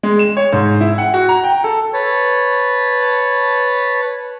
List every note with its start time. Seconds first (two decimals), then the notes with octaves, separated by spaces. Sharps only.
0.03 G#3
0.19 E7
0.37 C#5
0.53 G#2
0.80 E4
0.98 F#5
1.14 F#4
1.29 A#5
1.44 G5
1.64 A4
1.93 B4 C#5 A5